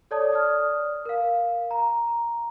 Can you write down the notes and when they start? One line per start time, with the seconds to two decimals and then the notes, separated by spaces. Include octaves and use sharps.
0.11 A4 C#5 D5 A5 D#6
0.32 D5 D#6 F6
1.05 A#4 F5
1.71 A#5